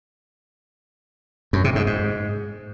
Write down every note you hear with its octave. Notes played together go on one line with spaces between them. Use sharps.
F#2
C3
G#2
G#2